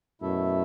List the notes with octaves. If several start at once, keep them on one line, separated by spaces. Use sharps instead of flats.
F#2 B2 A3 E4 A4 E5